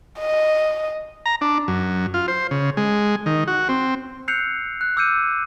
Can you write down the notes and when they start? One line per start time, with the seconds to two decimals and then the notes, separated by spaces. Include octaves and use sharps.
0.19 D#5
1.26 A#5
1.41 D4
1.68 F#2
2.14 F4
2.28 C5
2.51 C#3
2.77 G#3
3.26 D#3
3.48 F#4
3.69 C4
4.28 E6 F#6 G6 C7 C#7 F7
4.81 F#6
4.97 D6 E6 F6 G6 C#7 D#7